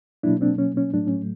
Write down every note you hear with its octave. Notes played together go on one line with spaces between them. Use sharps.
B2 F#3 A#3 D4 E4
C4 D4
C#4
C#4
A2 F#3 A3 D4
C#4